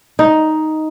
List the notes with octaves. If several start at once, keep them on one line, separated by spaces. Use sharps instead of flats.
D#4